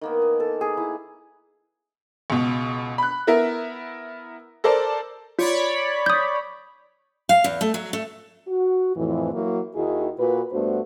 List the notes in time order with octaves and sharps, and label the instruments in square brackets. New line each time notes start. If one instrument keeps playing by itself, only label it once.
[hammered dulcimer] D#3 A#3 B3
G#5
[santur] A4
G#4
E4
[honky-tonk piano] C#2 B2
B5 F#6
B3 E4 A#4 E5
A4 A#4 C5 D5
[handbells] F4 [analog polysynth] C#5 D5 B5
[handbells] D#6 G6
[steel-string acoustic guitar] F5
E2
A3
F#3
A3
[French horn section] F#4
F2 A2 E3
F#3 A#3 E4 F#4
D#2 D#3 D#4 E4 F#4 G#4
A#2 F#4 B4
G2 A3 B3 D4 F#4 C5